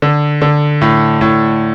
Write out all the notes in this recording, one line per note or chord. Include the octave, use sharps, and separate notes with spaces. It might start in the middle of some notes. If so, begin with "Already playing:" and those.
D3
D3
A2
A2